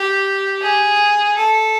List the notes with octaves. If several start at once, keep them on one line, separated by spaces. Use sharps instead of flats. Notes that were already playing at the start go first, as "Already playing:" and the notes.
Already playing: G4
G#4
A4